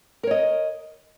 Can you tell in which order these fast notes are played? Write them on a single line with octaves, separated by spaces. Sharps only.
A#4 C#5 D#5